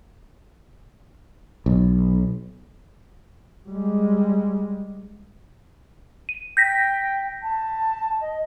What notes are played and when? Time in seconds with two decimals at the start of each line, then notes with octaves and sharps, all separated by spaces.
1.66 B1
3.68 G3 G#3
6.29 D#7
6.57 G5 G6 A#6 B6
7.42 A5
8.21 D#5